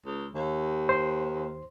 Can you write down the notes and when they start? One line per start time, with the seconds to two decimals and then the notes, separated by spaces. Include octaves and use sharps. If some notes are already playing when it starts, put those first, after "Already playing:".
0.06 C#2
0.35 D#2
0.89 C5 C6